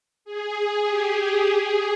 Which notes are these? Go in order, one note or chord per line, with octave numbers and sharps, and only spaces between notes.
G#4
G4
G#4